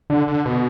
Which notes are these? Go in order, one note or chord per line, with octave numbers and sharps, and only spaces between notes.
D3
D3
B2